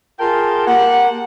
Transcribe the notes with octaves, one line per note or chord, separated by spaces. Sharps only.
F4 G#4 A#4 G5 A5
A#3 G4 F#5